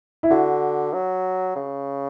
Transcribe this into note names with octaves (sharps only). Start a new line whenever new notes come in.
E4
D3 F#4
F#3
C#3